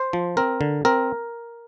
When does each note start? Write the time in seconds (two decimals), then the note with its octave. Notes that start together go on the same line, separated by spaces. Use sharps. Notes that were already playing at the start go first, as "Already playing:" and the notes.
Already playing: C5
0.13 F3
0.37 C4 A#4
0.61 D3
0.85 C4 A#4